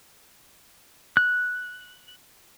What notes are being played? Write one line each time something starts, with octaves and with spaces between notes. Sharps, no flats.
F#6